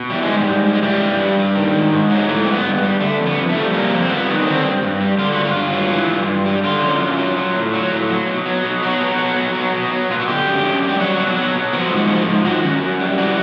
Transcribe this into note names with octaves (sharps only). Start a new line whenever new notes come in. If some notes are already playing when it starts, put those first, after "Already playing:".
Already playing: B2
E3 G3
G#3
G#2
G3
G#2
G3
G#3
E3 G3
G2
G2
G3
D#3
G#2
G#2
F#3
G#3
E3 A3
G2 C4
B3
G2
G#3
G3
D3 A3
F2
B3
F2
A3
G3
C3 A#3
F2
C4
G3 B3
D#3
C#4
D3 C4
G2
G2
G3
D3 F4
F#4
G2
F4
G2
F#3
E3
G2
G2
G3
D3 F4
F#2
F#2
F#3
F#3
A2
F#3
A2
F#3
B2
F#3
B2
F#3 F#4
B2
F#3
B2
F#3
B2
F#3
B2 F4
F#4
D3 G4
F#2
F#2
G3
G4
F#3 F#4
B2
F#3
B2
F3 F#4
G#2
F3
G#2
D#3 F#4
F#2
F#2
G3
E3 F#4